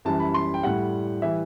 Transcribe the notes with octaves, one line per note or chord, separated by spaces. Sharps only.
F#2 E3 G3 A5
B5
C6
G5
A2 G3 F#5
E3 G3 E5